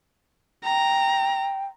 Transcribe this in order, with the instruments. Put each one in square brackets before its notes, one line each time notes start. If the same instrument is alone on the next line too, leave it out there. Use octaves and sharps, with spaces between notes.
[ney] G5 [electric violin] A#5